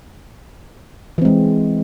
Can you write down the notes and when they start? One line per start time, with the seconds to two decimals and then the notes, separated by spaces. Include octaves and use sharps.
1.18 E3
1.22 C4
1.25 G#3